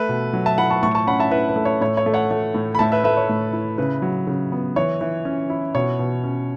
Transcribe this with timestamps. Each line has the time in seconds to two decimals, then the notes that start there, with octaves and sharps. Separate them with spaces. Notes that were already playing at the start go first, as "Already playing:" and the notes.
Already playing: A3 B4 E5
0.09 B2
0.33 F#3
0.46 E5 A5
0.58 E4 F#5 B5
0.70 A5 C#6
0.83 A2 A5 C#6
0.95 A5 C#6
1.07 C#4 F#5 B5
1.20 E5 A5
1.31 E4 B4 E5
1.49 B4
1.56 A3
1.65 C#5
1.81 A2 C#5
1.97 C#5
2.06 A3
2.14 C#5 F#5
2.31 A3
2.54 A2
2.75 B5
2.79 A2 E5 A5
2.92 B4 E5
3.04 A3 B4 E5
3.17 C#5
3.29 A2
3.53 E4
3.78 C#3 B4
4.02 F#3
4.27 C#3
4.52 B3
4.76 E3 C#5
5.01 E3
5.25 C#4
5.50 E4
5.75 B2 C#5
5.99 B2
6.24 C#4